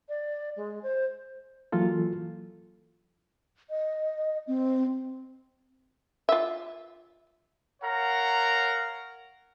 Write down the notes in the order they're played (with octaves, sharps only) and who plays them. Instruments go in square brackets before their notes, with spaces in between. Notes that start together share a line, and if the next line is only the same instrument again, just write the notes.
[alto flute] D5
G#3
C5
[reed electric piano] E3 F#3 A#3 F4 A4
[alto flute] D#5
C4
[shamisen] F4 E5
[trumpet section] A#4 C#5 F5 F#5 A#5